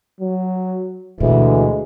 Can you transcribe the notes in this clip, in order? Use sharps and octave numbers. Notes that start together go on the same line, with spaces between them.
F#3
D2 B2 E3 G#3